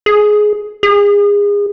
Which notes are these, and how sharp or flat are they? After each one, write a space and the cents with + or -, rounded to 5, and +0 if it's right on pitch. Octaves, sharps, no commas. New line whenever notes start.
G#4 +15
G#4 -30